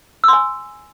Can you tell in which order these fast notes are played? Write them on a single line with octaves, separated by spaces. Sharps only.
E6 C6 G#5